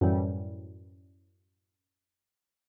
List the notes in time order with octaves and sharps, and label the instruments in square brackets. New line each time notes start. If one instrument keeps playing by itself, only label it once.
[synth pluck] F#2 A2 E3 G3